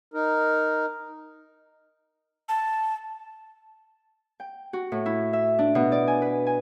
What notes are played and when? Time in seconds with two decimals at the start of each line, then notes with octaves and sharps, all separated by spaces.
0.14 D#4 A#4
2.49 A5
4.40 G5
4.73 F#4
4.92 A2
5.06 E4
5.33 E5
5.59 D4
5.75 B2
5.92 D5
6.07 G#5
6.22 B4
6.46 G#5